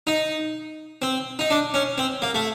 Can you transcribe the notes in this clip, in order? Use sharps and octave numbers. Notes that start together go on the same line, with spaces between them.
D#4
C4
D#4
D4
C#4
C4
A#3
A3